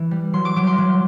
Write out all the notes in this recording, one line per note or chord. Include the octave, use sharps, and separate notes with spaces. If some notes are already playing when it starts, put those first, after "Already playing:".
Already playing: E3
G3
F#3 C6
D6
F#3 D6
C6
F#3